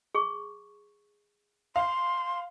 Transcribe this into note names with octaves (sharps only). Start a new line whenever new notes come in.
G#4 C#6
F5 C6